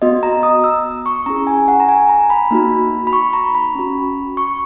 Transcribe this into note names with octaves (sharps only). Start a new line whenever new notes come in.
B3 F#4 D#5
A#5
D#6
E6
C#6
C#4 E4 G#4 A#5
G#5
F#5
A#5
G#5
A#5
B5
A#3 D#4 F#4
B5
C#6
A#5
B5
C#4 F#4
C#6